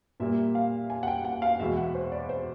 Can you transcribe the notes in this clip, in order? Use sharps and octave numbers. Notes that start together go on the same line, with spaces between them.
A#2 G3 A#3 E5
F5
G#5
F#5
G5
F#5
F5
E2 B2 G#3 E5
F#5
C5
D5
C5